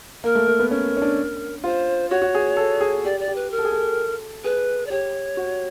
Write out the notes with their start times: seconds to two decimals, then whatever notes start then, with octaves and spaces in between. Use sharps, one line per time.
0.24 A#3 A#4
0.35 A3
0.48 A#3
0.59 B3
0.71 C#4 A#4
0.97 C#4
1.02 D4
1.64 F4 C5
2.10 F#4 C#5
2.22 F#4
2.35 G#4
2.57 A4
2.81 G#4
3.05 G4 D5
3.20 D5
3.28 G4
3.36 B4
3.51 A#4
3.58 A4
3.65 G#4
3.72 A4
4.44 G#4 B4
4.87 D5
4.90 G4 C#5
5.37 F#4